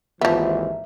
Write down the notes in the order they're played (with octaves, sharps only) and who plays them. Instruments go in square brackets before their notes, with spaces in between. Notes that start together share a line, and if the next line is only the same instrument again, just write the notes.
[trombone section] G#1 D#2 E3 [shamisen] F3 B3 [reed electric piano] E5